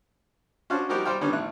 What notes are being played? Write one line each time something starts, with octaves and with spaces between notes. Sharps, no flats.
C#4 D4 F#4 C5 F5 A5
F3 G3 D#4 F#4 G4 A#4
G3 C5 F5 G5
D3 D#3 G3 B3 C#4
A1 E4 F#6